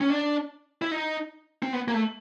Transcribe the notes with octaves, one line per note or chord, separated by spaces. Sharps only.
C#4
D4
E4
D#4
C4
B3
A#3
A3